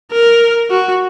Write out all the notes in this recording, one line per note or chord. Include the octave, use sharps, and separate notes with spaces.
A#4
F#4